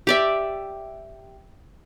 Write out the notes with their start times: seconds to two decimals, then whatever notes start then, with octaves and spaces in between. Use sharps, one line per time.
0.07 G4 D5 E5